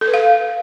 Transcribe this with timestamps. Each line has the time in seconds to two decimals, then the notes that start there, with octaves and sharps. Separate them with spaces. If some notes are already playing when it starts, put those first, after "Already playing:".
0.01 A4
0.07 B4
0.14 F5